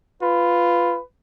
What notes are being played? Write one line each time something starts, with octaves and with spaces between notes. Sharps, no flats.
F4 B4